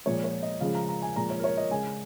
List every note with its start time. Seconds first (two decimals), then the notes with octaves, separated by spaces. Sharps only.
0.06 A#2 F3 G#3 C#5
0.24 C#5
0.43 D#5
0.61 C#3 F3 G#3 F5
0.75 A#5
0.89 A#5
1.02 G#5
1.16 A#2 F3 G#3 A#5
1.30 C#5
1.39 A#4
1.44 C#5
1.57 D#5
1.71 C#3 G#3 G#5